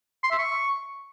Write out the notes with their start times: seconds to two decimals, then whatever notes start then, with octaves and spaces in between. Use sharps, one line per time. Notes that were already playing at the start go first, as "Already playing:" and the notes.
0.23 C6
0.31 E5
0.38 C#6